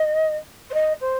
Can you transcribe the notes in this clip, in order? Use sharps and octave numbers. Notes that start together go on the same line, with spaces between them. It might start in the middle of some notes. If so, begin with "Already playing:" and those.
Already playing: D#5
C5
D#5
C5